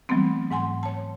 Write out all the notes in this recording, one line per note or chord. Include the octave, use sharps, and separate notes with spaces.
E3 F#3 G3 A3 B3 C4
G#2 F#5 G#5 C6
C#5 A5